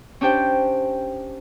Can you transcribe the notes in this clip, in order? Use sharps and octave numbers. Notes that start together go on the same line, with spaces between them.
C#4 D4 G4 C5 G5